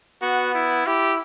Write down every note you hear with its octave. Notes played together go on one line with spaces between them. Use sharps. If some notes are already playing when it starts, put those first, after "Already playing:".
B3 F#4
E4
E4 G4